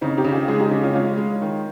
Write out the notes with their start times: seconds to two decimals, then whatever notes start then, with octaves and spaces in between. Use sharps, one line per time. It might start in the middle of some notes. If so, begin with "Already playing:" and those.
0.01 C#3 C4 D#4
0.17 D#4 G4
0.24 C#3
0.33 F4 G#4
0.48 G#3 F4 G#4
0.59 D#4 G4
0.71 C#3
0.83 C#4 F4
0.95 G#3 C#4 F4
1.18 G#3
1.42 D#3